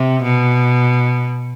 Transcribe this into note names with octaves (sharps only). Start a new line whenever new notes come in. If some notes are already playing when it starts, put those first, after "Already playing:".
Already playing: C3
B2